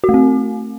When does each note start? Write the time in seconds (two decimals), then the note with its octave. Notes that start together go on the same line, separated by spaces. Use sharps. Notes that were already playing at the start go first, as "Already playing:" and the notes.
0.04 F#4
0.09 A3
0.14 C4